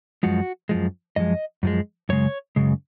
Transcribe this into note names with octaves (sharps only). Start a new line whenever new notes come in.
F#2 F3 G#3 F#4
F#2 F3 G#3
F#2 F3 G#3 D#5
F#2 F3 G#3
F#2 C#3 G#3 C#5
F#2 C#3 G#3